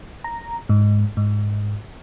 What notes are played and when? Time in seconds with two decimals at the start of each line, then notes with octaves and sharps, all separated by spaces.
0.24 A#5
0.69 G#2
1.17 G#2